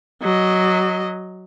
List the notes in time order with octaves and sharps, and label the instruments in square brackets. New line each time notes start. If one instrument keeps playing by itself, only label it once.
[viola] F#3 D#5